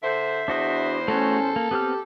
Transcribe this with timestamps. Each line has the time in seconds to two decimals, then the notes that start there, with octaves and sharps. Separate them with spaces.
0.03 D3 C5 E5
0.48 E2 D4 F#4 C5 D#5
1.08 A3 C#4 F#4 A4 C#5
1.56 A#3
1.71 B3 C4 G4 F6